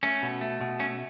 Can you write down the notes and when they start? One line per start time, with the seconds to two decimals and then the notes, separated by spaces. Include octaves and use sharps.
0.03 A3 C#4
0.22 B2
0.41 A3
0.61 B2
0.79 A3 C#4